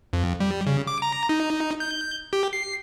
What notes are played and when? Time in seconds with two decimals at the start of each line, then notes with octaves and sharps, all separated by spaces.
0.13 F2
0.40 G3
0.67 C#3
0.87 D6
1.02 A#5
1.29 D#4
1.80 G6
2.33 G4
2.53 C7